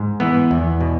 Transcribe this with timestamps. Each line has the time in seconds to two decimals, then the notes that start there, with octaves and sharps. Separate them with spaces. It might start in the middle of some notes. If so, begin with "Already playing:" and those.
Already playing: G#2
0.20 E3 B3
0.51 E2
0.81 B2